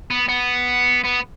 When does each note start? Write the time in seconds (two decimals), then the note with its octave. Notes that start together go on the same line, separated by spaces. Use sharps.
0.11 B3
0.29 B3
1.05 B3